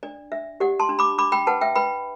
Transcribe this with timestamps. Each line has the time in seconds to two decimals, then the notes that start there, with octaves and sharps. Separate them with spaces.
0.03 D4 D5
0.32 D4 E5
0.60 G4 D5 F#5
0.80 A5 C6
0.89 D4
0.99 B5 D6
1.18 D4 B5 D6
1.32 G5 B5
1.47 B4 F#5 A5
1.61 E5 G5
1.76 B4 G5 B5